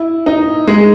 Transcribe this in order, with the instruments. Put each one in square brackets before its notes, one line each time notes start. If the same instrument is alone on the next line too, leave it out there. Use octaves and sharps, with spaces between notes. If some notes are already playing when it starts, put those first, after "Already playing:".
Already playing: [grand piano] E4
D#4
G#3